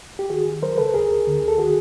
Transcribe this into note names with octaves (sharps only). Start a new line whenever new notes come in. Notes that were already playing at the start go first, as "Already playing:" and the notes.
G4
D#3 F#4 G#4
D#3
F#3 A#4 C5
C#3 A4 B4
D2 G#4 A#4
D2
D3
D2
A4
D#3 F#4 G#4